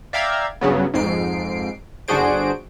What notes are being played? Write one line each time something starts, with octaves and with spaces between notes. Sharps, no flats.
D5 E5 F5 G5 A#5 G#6
G2 C#3 F#3 B3
F2 G#2 C7 D7
G1 D4 F#4 G#4 C5 D7